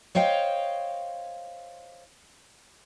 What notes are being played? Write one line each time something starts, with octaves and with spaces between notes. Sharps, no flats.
C5 C#5 D#5 F5 G5